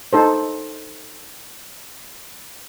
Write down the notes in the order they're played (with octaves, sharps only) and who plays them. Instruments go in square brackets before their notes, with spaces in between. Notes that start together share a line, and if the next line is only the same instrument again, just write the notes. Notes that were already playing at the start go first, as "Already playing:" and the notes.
[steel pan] D#4 A4 C5